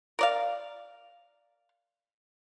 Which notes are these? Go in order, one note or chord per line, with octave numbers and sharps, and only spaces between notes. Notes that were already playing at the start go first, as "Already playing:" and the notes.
A#4 D5 F5